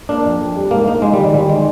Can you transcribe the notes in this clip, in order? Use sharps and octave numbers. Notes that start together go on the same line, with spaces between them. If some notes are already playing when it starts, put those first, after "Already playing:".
A#3 D4
F2
F2
G3
G#2 A#3
A#3 D#4
G#3 D#4
D#3 G3
G#3
D#3 G3
G#3